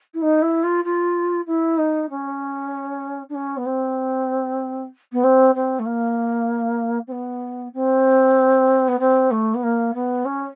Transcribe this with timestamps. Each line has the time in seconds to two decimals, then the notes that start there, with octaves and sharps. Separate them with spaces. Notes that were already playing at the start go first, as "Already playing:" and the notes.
0.14 E4
0.22 D#4
0.42 E4
0.63 F4
0.84 F4
1.47 E4
1.77 D#4
2.10 C#4
3.29 D4
3.34 C#4
3.57 B3
3.66 C4
5.12 B3
5.24 C4
5.55 C4
5.79 A3
5.85 A#3
7.07 C4
7.12 B3
7.74 C4
8.88 B3
8.99 C4
9.31 A3
9.54 B3
9.63 A#3
9.94 B3
10.25 C#4